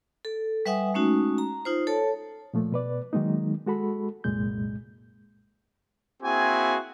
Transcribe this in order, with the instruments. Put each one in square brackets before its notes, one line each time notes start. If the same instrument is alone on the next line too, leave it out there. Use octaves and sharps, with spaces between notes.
[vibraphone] A4
G3 B4 E5 F#5 G#5 D#6
G#3 A3 C#4 D#4 F#4
A#5
D#4 F4 C5
A4 C#5 A5
[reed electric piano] A#2 F3 A3
B2 B4 D5
D#3 F#3 G#3 A#3 D#4
G#3 F#4 A4 B5
C2 F#2 A#2 G#3 G6
[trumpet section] A#3 C4 E4 F#4 G#4 G#5